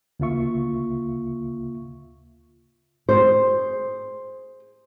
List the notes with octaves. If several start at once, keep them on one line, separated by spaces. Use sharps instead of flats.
D2 C#3 A#3 F4 E5 C#6
G#4 C5